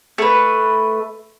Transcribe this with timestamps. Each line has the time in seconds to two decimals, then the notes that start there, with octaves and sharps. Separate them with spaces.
0.18 A3 B4